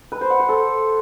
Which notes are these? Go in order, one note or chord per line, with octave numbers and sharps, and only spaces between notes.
B4
C5
F#5
C5
A4